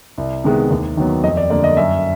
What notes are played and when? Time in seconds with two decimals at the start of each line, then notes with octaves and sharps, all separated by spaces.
0.18 C2
0.44 C3 D#3 G#3 B3
0.71 D#2
0.97 D#3 F#3 B3
1.24 F2 D#5
1.37 D5
1.50 D3 G3 A#3 D5
1.64 D#5
1.77 F#2 E5